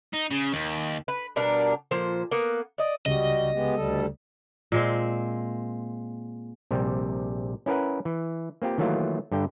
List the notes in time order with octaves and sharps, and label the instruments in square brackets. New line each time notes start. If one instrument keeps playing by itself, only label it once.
[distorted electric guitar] D#4
C#3
D#2
[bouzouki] B4
B2 G3 D4 A#4
A#2 F3 C5
A#3 B3
D5 D#5
[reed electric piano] C#2 C#3 [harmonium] G3 F#4 G4 [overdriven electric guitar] D#5
[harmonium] G#3 B3 G4
D2 G3 A4
[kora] A#2 G#3 C4
[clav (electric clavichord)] A#1 C3 G3
C#4 E4 A#4 B4 F#5
E3
A#3 C4 F4 G4
D#3 E3 F#3 A3 A#3 F4
G2 D3 G5